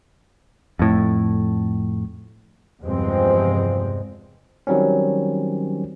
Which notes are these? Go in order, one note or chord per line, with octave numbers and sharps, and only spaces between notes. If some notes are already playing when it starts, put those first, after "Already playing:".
F2 A2
E2 G2 C3 F3 G#3 C4
D#3 F#3 G3 C4 C#4